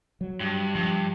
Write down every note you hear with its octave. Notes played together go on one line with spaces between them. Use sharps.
F#3
G2
G2 F3